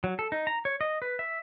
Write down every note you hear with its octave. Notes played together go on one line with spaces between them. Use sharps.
F#3
A4
D#4
A#5
C#5
D#5
B4
E5